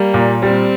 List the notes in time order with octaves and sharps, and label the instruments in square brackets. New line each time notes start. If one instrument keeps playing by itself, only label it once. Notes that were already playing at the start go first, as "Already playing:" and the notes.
Already playing: [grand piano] G3 [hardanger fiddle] A#3
[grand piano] A#2
[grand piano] G3 [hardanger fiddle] C4